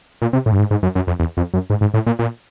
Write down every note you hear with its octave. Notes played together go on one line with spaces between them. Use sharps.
A#2
C3
A2
G2
G#2
G#2
F#2
F#2
F2
E2
F2
F#2
G#2
G#2
A2
A#2
A#2